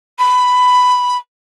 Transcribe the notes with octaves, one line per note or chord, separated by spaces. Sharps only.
B5